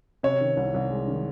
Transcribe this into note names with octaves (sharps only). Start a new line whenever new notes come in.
C3 C#5
D#3
C2
C2
G#3
D#3